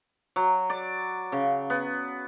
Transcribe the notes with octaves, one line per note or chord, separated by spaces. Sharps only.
F#3
D5
C#3
B3